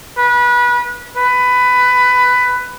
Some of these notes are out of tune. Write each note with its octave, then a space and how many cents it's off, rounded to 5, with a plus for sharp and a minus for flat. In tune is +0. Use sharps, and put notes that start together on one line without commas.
B4 -25
B4 +15